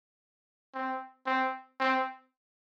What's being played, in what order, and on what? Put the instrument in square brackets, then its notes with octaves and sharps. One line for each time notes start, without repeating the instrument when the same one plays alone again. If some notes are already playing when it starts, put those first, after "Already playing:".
[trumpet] C4
C4
C4